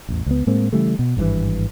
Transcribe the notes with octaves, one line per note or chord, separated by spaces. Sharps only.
A1 E2
C#2 B3
A2 G#3 A#3 C4
C#3 E3 G3 A3
B2
G#1 G2 B2 E3